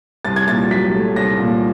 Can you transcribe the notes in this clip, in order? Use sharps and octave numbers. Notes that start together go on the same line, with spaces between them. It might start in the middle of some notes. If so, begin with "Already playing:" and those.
C2 A6
G#6
A#2 A6
F#3 B6
A3
C2 A#6
A#2